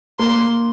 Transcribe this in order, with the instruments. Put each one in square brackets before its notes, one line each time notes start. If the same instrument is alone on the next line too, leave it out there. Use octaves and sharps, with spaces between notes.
[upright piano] A#3 [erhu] C6